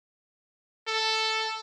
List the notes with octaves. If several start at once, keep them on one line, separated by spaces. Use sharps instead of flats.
A4